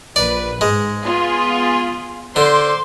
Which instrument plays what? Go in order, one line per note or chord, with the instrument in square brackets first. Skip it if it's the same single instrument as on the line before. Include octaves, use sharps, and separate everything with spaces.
[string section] A#1 B4 [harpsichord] D5
[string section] G#2 [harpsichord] G#3
[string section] B3 F4 G#4
[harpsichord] D3 [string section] C5 C6 D6